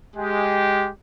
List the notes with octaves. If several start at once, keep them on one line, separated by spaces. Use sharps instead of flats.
G#3 G4